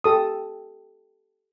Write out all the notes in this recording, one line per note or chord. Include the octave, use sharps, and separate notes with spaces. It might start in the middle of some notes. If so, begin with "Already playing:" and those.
G4 A4 D#6